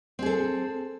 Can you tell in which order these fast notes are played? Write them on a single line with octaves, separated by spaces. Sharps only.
C4 G#4 A4